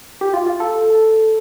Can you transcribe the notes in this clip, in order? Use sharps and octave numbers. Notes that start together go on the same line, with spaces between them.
G4
F4
F4
A4